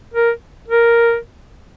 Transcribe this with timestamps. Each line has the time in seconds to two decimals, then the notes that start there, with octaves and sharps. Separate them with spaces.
0.14 A#4
0.68 A#4